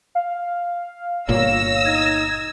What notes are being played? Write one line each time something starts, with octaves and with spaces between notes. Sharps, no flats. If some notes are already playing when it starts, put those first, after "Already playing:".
F5
G1 A#2 A#3 C#5 E6 A#6
D#4 G#6